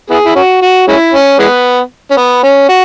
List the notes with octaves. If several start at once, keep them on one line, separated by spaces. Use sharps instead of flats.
B3 E4 G#4
E4
C#4 F#4
F#4
G#3 C#4 E4
C#4
E3 G#3 B3
C#4
B3
C#4
F#4